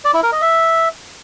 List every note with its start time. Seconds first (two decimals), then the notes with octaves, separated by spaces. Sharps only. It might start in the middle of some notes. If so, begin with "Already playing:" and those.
0.05 D5
0.14 E4
0.23 A#4
0.32 D#5
0.42 E5